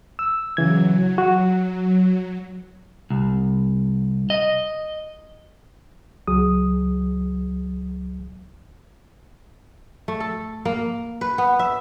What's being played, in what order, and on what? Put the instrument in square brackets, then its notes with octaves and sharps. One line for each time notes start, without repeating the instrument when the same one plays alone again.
[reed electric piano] E6
[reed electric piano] C#3 E3 G#6 [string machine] F#3
[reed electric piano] F#4
[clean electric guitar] C2
D#5
[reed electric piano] C#2 F#3 G#4 D#6
[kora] A3
A4
A#3
B4
B3
E5